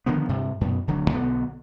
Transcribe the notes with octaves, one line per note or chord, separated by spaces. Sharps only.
D3 D#3 F3 B3
G2 C3
F#2 B2
D1 D3 F#3
B1 B2 D3 B3